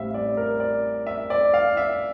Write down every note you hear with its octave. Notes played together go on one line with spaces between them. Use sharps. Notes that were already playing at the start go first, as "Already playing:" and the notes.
Already playing: A1 A2 G3 C4 E5 F5
D5
A#4
D5
E5
D5
F5
E5